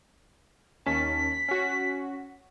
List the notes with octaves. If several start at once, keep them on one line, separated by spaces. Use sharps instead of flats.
D#2 C#4 A5 B6
C#4 F#4